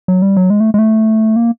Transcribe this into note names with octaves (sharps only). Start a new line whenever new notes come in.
F#3
G3
F#3
G#3
A3
G#3
A3
A#3